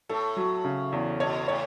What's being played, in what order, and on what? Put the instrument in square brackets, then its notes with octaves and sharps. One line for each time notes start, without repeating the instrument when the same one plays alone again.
[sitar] A2 [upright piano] A4
[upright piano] F#3
C#3
E2
[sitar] B2 [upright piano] C#5
[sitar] A2 [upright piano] C#5